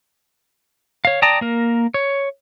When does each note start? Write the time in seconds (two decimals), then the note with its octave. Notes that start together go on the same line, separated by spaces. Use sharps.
1.05 C#5 F5
1.22 D5 G5 A5 A#5 D#6
1.41 A#3 A#4
1.94 C#5